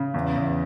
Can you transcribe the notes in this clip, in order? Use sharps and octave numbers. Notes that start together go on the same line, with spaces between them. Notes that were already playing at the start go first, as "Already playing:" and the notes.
Already playing: C#3
E2
E2